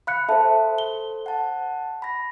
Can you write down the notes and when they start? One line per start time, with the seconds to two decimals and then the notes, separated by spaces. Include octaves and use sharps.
0.07 F5 B5 F#6 C#7
0.29 A4 C5 E5 A5
0.78 G7
1.26 F#5 A5
2.02 B5 A#6